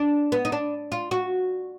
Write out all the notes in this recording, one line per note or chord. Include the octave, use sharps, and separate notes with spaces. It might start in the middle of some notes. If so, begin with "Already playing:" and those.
Already playing: D4
B3
D#4
D4
F4
F#4